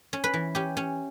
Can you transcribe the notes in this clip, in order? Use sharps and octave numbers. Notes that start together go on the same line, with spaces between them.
C#4
B4
E3
C#4 G4
C#4